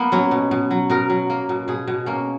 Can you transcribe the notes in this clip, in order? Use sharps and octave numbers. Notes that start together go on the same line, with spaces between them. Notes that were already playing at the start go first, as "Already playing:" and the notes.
Already playing: A#3 B3
F#3 C#4
B2
B2
F#3
B2 A#4
F#3
A#3
B2
B2 G#4
B2
A#3 C#4